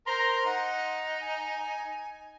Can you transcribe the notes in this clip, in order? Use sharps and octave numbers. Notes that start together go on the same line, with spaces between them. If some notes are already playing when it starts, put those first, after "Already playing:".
A#4 C5 A#5 C6
D#4 F#5
G#5